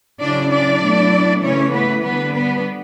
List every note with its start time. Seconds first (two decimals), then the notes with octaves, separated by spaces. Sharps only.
0.21 C#3 F#3 C#4 D4 E4 D5
0.51 D4 D5
0.82 B2 F#3 A3 E4
1.43 C#3 E3 A3 C#4 C#5
1.73 B3 B4
2.03 D3 G3 B3 D4 B4
2.33 B3 B4